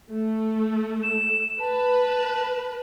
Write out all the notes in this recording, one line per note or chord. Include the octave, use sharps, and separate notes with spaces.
A3
E7
B4 A5